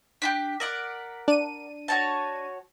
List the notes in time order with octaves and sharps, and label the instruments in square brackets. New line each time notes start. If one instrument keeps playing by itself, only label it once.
[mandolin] D4 F4 G4 [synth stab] B6
[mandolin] A#4 D5 F#5
[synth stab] D4 D#7
[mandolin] F#4 C#5 A5